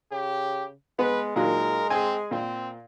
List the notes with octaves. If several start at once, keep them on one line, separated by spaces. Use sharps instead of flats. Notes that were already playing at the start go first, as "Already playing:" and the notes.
C#3 G4
G#3 B3 B4
A#2 D#3 F#3 G#3 A#4
C4 G#4 G#5
A#2 C4